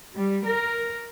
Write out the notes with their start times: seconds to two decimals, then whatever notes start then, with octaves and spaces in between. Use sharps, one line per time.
0.15 G3
0.45 A#4